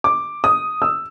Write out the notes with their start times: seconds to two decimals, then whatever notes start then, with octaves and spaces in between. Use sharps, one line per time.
0.04 D6
0.44 D#6
0.82 E6